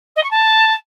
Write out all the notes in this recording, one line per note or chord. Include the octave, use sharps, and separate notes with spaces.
D#5
C#6
A5